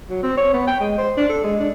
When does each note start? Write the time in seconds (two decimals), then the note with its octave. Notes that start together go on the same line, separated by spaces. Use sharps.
0.09 F#3
0.23 C4
0.37 C#5
0.53 B3
0.67 G5
0.80 G#3
0.98 C5
1.17 D4
1.29 A4
1.44 G#3
1.60 D4